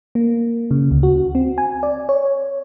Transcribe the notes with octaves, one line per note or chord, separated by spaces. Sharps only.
A#3
C#3
D2
F#4
C4
G#5
D5
C#5